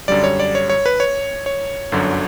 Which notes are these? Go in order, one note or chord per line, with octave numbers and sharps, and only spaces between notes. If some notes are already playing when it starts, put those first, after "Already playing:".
F#2 D3 G3 D5
C#5
D5
C#5
C#5
B4
C#5
C#5
G1 F#2 D3 F#3